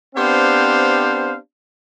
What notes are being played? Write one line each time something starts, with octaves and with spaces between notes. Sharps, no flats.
B3 C4 D4 G4 C5 F5